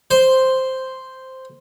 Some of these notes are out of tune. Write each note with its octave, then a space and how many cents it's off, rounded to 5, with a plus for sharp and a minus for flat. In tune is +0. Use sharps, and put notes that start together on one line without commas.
C5 +0